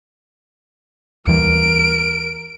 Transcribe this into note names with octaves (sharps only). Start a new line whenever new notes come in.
D#2 E3 G3 A#4 D7